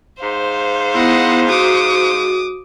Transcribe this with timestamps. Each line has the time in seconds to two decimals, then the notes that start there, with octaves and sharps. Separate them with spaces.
0.22 G#2 C5 F5
0.94 B3 E4 D#5 F#5
1.49 F#4 D6 D#6